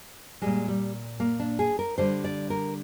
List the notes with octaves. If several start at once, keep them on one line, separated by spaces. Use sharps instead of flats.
A#2 G3 G#3
G3
A#3
D4
G#4
A#4
D3 G3 C5
D5
A#4